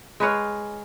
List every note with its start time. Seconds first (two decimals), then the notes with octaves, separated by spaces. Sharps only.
0.20 G#3 B4 C#5 F5